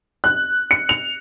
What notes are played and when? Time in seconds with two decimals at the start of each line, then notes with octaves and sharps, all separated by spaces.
0.24 F#6
0.71 C#7
0.89 F7